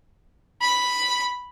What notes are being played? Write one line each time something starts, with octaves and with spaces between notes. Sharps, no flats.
B5